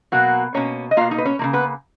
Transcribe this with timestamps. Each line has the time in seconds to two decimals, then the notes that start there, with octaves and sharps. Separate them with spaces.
0.12 B2 F#3 A#3 F#4
0.54 B2 A#3 C#4 C#5
0.91 D#5
0.97 B2 A#3 F4 F5
1.11 D#4 D#5
1.18 B4
1.25 C#4 C#5
1.39 C#3 F3 A#3
1.53 B3 B4